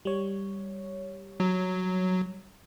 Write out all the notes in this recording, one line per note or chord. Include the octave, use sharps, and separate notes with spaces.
G3 C#5
F#3